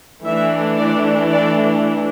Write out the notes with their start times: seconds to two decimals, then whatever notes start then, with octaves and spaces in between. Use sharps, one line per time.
0.24 E3 A3 D4 E5
0.77 D5
1.31 D5